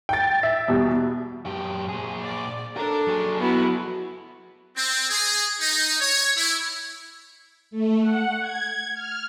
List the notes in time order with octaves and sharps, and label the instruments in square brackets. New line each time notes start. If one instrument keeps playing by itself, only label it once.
[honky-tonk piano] G5 A6
E5
E2 B2 G3
[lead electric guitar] F#2 G4
A#2 G#4
[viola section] D5
[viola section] D4 A4 [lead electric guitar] A#4
[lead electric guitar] F#3 G#4
[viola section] B3 E4 F#4
[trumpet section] C4
G#4
D#4
C#5
E4
[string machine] A3
F#5
G#6
F6